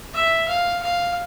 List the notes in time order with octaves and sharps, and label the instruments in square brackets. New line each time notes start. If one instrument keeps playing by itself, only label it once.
[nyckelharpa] E5
F5
F5